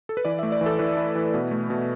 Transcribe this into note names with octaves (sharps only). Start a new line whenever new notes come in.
A4
B4
E3 D5
A3 E5
D5
E3
A4
E3 B4
E4
E3
B2
A3
B2